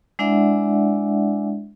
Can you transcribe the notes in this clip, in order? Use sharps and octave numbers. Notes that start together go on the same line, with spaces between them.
G#3 D4 E4 D5 E5 F#5